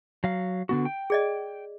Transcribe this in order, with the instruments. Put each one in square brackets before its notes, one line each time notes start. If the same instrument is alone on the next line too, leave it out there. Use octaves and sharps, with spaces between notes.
[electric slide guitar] F#3 F5
D3 B3 F#4
G5
[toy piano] G#4 D5 D#5